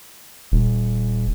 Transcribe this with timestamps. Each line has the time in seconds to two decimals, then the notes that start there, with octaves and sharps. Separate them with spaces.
0.52 D#1